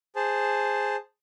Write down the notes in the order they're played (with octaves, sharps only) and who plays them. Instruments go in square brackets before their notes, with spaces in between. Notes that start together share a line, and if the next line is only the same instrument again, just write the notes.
[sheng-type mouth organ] G#4 C5 A5